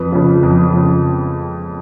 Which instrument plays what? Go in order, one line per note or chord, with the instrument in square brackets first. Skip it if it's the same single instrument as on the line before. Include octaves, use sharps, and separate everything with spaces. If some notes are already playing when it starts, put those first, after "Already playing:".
Already playing: [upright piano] F2 B4
C#3 F3
F2
C#3 F3